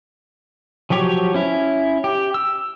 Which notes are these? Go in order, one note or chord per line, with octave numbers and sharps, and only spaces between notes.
F3 F#3 G4 C#5
C#4 E4
G4
E6